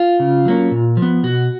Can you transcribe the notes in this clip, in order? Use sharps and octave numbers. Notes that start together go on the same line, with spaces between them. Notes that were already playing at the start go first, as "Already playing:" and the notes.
Already playing: F4
C#3
F#3 A#3 C#4
A#2
F3
B3
B2 F#4